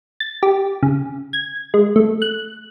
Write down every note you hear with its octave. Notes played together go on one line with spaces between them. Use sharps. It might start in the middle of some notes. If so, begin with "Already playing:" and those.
A6
G4
C#3
G#6
G#3
A3
F#6